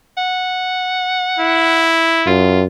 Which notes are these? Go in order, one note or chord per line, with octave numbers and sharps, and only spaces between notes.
F#5
E4
F#2 F4